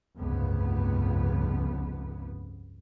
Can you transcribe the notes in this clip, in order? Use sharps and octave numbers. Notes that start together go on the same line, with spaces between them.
F1 C#2 G2 C3 B3